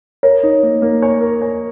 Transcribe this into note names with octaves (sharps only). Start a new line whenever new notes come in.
A#4 C#5
D#4
A#3
A#3
C#5
A#4
C#5